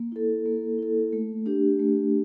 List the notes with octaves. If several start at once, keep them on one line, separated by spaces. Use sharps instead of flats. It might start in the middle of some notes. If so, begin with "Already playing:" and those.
Already playing: A#3
E4 A4
A#3
E4 A4
A3
D4 G4
A3